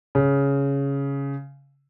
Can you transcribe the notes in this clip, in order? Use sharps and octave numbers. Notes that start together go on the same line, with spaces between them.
C#3